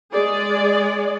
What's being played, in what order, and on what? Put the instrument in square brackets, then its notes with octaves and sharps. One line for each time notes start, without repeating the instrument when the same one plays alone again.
[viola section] G#3 G#4 D5